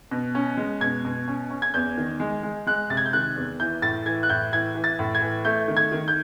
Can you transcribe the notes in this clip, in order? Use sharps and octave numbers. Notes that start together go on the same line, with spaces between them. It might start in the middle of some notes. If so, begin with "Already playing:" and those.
B2
C#4
G#3
B2 G#6
B2
C#4
C#4
G#6
E2 G6
D#3
G#3
G#3
G#3 F#6
C3 A6
G#6
G6
D#3 F#6
E2
E3 G6
A2 A6
E3 G#6
F#6
A2 G6
E3 G#6
E3
A6
A2
G#6
E3
A3 G6
D#3
G#6
D#3
G6